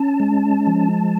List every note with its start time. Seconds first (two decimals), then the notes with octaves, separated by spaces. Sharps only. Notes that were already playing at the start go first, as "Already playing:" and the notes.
Already playing: C#4 A5
0.20 G#3
0.67 F3